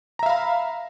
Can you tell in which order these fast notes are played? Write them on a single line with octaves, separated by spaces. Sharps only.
A#5 E5 F5 B5